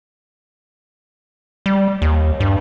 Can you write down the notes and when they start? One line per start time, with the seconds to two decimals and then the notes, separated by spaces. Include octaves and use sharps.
1.66 G3
2.02 D#2
2.40 G2